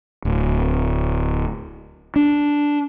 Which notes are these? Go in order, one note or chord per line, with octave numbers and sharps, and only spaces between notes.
D1
D4